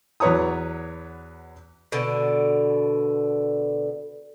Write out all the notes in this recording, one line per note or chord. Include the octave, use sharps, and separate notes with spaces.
E2 F#3 B4 C#5 A#5 D#6
B2 D3